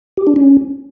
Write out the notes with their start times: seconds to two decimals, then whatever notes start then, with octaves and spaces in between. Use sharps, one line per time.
0.17 G4
0.27 D4
0.36 C#4